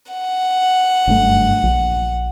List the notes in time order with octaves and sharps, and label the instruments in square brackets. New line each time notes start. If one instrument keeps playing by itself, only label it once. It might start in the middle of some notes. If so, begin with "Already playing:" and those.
[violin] F#5
[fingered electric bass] F#1 G2 A3
A#1